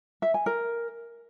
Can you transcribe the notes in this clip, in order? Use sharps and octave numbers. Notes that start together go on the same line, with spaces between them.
E5
G#5
A#4